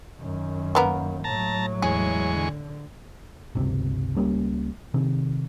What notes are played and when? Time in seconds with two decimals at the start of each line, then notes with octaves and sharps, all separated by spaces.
0.19 F#2 D#3
0.75 A#3 B3 A#4
1.24 A2 F#3 A5 A#5
1.82 E2 G#3 G#4 C#6
2.36 D3
3.55 G1 C#2 C3
4.17 C#2 G3 A#3 C#4
4.94 C3 D#3